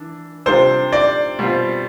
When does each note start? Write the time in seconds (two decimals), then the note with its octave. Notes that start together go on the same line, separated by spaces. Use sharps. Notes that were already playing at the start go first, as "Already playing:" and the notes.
Already playing: E3 D4
0.46 C3 G3 D4 F4 C5
0.92 D5
1.39 B2 G3 C4 F4